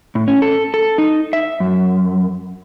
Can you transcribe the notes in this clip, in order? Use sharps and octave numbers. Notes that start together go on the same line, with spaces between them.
A2
C#4
A4
A4
D#4
E5
F#2